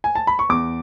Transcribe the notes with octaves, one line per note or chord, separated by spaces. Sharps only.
G#5
A5
B5
C#6
E2 D6